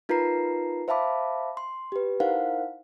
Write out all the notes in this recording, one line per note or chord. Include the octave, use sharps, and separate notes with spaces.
D#4 F4 A#4 B4 A#5 C7
C5 E5 F5 A5 B5 D6
C6
G4 B4
D#4 E4 A#4 C5 F5 F#5